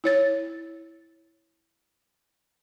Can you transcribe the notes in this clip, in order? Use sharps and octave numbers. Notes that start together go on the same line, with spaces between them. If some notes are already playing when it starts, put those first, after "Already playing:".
E4 C#5 A6